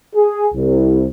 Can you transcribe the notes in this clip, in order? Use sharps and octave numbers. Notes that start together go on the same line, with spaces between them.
G#4
C2